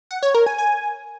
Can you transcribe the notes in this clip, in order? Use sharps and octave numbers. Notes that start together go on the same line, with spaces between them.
F#5
C#5
A#4
G#5
G#5